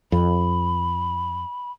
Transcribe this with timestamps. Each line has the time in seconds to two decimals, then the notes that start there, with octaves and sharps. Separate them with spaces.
0.12 F2 B5